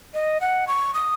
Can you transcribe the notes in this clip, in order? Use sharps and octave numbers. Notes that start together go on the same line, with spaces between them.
D#5
F#5
C#6
D#6